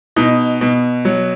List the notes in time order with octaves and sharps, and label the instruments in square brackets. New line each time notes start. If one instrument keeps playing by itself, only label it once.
[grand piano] B2 D#4
B2
F#3